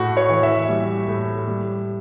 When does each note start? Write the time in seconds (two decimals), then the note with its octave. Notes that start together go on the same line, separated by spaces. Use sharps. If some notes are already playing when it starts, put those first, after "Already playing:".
Already playing: A2 F#4
0.17 C#5
0.30 E3
0.43 E5
0.69 G3
1.08 A2
1.47 G3